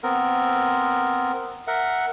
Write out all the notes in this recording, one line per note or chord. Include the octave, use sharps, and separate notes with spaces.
B3 C4 A#4
A#4 E5 F#5